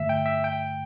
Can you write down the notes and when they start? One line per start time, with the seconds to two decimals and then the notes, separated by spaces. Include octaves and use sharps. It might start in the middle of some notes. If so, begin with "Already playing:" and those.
Already playing: G2 D3 A3 E5
0.09 G5
0.26 E5
0.44 G5